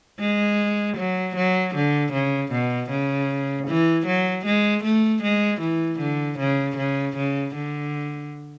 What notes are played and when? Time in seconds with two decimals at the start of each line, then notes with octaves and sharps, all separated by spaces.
0.20 G#3
0.97 F#3
1.36 F#3
1.75 D3
2.13 C#3
2.52 B2
2.90 C#3
3.67 E3
4.07 F#3
4.46 G#3
4.84 A3
5.23 G#3
5.61 E3
5.99 D3
6.39 C#3
6.77 C#3
7.17 C#3
7.55 D3